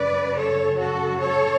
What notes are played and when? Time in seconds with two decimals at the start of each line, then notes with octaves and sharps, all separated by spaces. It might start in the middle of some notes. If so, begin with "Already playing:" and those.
Already playing: F#2 C#3 F#3 B4 D5
0.36 A4 C#5
0.78 F#4 A4
1.18 A4 C#5